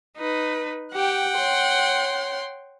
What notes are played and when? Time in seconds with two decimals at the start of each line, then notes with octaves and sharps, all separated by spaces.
0.17 D#4 B4
0.93 G4 F#5 G5
1.36 C#5 C6